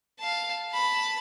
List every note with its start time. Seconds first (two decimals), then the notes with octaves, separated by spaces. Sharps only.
0.19 F5 A5
0.71 A5 B5